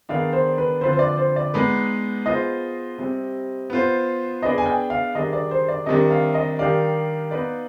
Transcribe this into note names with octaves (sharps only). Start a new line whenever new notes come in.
D#3 B3 D4 G#4 D5 F5
C5
B4
D3 F3 C4 F4 B4 C5
C5
D5
C5
D5
G#3 B3 D#4 B4
B3 F4 G#4 C5 D#5
C3 G3 C4
B3 F4 C5
B3 D4 G#4 B4 D5 D#5
G#5
G5
F5
D#3 G3 D4 G#4 D#5
D5
C5
D5
C3 D#3 G3 D4 D#5
F5
D#5
D#3 G3 D4 G4 D5 F5
B3 D#4 B4 D5